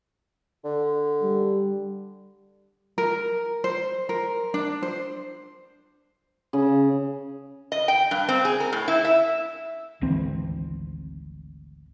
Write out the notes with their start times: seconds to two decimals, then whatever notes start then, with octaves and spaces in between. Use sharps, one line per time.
0.64 D3
1.23 G3
2.98 A#4
3.64 C5
4.09 A#4
4.54 D4
4.83 C5
6.53 C#3
7.72 D#5
7.88 G5
8.11 G2
8.29 C4
8.45 G#4
8.60 A#4
8.73 A2
8.88 E4
9.05 E5
10.01 G#1 D2 E3 C4